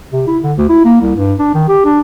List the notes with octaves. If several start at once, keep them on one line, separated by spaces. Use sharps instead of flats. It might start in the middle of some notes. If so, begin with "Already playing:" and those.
C3
E4
D3
D2
E4
A#3
C2
G2
D4
D#3
G4
D4